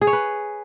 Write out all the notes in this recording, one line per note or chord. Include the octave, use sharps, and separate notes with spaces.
G#4
C#5
B4